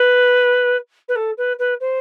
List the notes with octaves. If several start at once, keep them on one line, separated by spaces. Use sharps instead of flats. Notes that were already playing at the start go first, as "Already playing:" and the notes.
Already playing: B4
B4
A4
B4
B4
C5